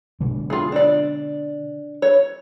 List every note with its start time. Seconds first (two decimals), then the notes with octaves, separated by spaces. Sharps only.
0.20 B2 D3 G#3
0.50 F4 G#4
0.72 D4 D5
2.02 C#5